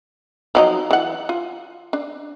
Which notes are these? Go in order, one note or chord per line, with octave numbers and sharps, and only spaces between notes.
F3 F#3 D#4
E3 F#5
F4
D4